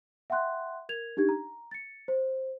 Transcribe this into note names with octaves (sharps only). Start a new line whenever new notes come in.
E5 F#5 G5 C6 F#6
A#4 G#6 F7
D4 D#4 G4 G#6
A#5
A6 C#7
C5